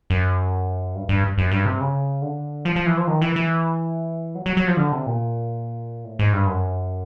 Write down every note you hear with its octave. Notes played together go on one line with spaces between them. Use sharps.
F#2
G2
G2
F#2
G2
C3
C#3
D3
F3
F3
E3
F3
D#3
E3
E3
F#3
F#3
F#3
F3
D3
C3
A#2
A2
G#2
G2
F#2